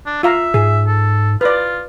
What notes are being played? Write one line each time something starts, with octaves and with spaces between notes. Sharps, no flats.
D4
F4 E5 F5 A#5
G#2 G#4
A4
F4 B4 D5